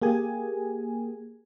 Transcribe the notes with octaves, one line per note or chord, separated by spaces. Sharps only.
A#3 G4 G#4 G#5